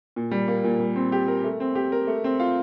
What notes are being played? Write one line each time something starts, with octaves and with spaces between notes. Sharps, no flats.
A#2
G3
A#3
A#2
G3
C4
G4
A#4
A3
C4
G4
A#4
A3
C4
F4